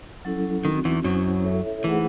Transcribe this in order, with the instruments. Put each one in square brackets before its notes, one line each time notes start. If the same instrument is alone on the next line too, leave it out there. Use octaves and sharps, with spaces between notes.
[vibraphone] F#3 C#4 E4 A4
[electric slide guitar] D#3 [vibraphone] C4 D#4 F#4
[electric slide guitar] E2 E3
[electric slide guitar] F#2 F#3 [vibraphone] C#4 E4 C5
[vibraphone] E4 A4 C#5 E5
[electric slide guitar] E3 [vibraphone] A3 D#4 G#4 C5 F#5